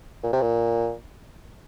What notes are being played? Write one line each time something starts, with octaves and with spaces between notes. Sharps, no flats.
A#2
C3
A#2